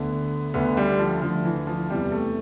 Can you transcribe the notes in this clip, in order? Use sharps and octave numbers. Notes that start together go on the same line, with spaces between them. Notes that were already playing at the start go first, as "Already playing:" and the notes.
Already playing: D2 D3 B3
D2 D3 B3
G3
F3
D2 D3 F3
E3
F3
E2 C3 E3 G3
A3